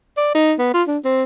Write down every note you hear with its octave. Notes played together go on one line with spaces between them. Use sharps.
D5
D#4
B3
F4
D4
C4